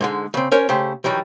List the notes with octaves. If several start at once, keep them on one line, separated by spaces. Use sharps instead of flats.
G#2 D3 G#3
C#3 C4
C#4 A#4 C5 C#5
C#3 A3 G4 C5
D#3 E3 F#3 G3